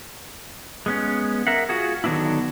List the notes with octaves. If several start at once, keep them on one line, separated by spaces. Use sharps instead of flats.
G#3 B3 C#4
A#4 E5 F#5
F4 F#4 G#4
D3 D#3 F#3 B3 D4 E4